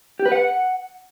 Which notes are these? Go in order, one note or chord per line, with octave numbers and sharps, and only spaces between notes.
G4
B4
F#5